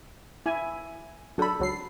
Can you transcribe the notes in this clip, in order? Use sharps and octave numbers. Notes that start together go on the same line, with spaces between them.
E4 G#5
F#3 D4 A4 B5
C#2 F#3 C7